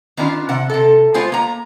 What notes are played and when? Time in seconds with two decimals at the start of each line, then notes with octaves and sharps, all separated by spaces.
0.17 D#3 B3 C#4 D4 F4
0.49 C3 F#5
0.70 C3 A4
1.14 G#3 B3 F4 C5 G#5
1.32 A#3 A#5